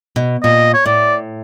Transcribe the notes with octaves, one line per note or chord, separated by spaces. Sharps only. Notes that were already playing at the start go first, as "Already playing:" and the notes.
B2
A#2 D#5
C#5
A2 D5